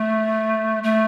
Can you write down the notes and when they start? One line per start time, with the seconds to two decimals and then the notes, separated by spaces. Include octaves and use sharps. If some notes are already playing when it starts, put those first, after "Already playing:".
Already playing: A3
0.83 A3